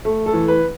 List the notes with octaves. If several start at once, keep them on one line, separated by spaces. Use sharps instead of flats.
A3
A4
E3
B4